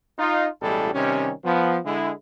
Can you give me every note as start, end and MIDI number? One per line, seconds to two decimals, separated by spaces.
0.18 0.47 63
0.18 0.47 65
0.62 0.91 33
0.62 0.91 47
0.62 0.91 55
0.62 0.91 56
0.62 0.91 64
0.62 0.91 69
0.94 1.31 48
0.94 1.31 51
0.94 1.31 55
0.94 1.31 61
1.45 1.77 53
1.45 1.77 59
1.85 2.11 50
1.85 2.11 56
1.85 2.11 64